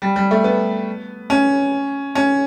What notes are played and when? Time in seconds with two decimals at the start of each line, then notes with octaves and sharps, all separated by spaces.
0.02 G3
0.16 G3
0.31 A3
0.44 B3
1.30 C#4
2.15 C#4